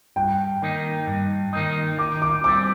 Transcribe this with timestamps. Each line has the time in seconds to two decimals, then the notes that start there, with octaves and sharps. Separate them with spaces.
0.16 G2 G5
0.62 D#3 A#3 D#4
1.07 G2
1.53 D#3 A#3 D#4
1.98 D#3 D6
2.22 D6
2.44 G3 C4 D6